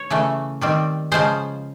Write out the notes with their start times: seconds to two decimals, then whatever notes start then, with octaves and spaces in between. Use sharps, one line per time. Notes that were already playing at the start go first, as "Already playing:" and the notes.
Already playing: C#5
0.10 C#3 E3 A3
0.61 D#3 G3 C4
1.12 C#3 F3 G#3 C5